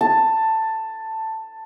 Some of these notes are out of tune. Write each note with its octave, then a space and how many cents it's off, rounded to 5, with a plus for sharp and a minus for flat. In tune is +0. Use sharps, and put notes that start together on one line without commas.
A5 +10